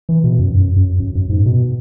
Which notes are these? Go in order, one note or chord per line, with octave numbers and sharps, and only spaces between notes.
E3
B2
F#2
F#2
F#2
F#2
F#2
G#2
B2